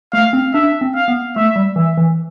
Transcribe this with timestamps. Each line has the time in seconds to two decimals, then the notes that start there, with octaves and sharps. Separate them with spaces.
0.13 A3 F5
0.33 C4
0.54 D4 E5
0.81 C4
0.95 F5
1.08 B3
1.36 A3 E5
1.56 G3
1.76 E3 E5
1.98 E3